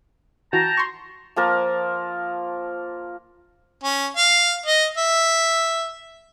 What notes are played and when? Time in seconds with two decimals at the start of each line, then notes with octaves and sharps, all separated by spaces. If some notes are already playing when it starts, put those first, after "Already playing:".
0.53 E3 F#4 G5 A5 A#5
0.77 C6 C#6
1.36 F3 A#3 A#4 A5
3.84 C#4
4.17 F5
4.66 D#5
4.97 E5